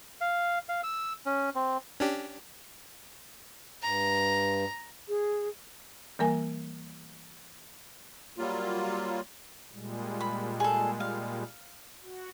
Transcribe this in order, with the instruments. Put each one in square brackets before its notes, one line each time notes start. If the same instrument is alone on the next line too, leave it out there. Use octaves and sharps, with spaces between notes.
[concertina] F5
F5
E6
C#4
C4
[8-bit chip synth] C#4 D4 G4
[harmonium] G2 [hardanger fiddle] A#5
[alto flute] G#4
[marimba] E3 G3 A#3 A#4 G#5
[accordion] F#3 G3 A#3 F4
[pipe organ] A#2 G3 G#3
[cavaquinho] B5
G#4 A4
F5
[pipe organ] F#4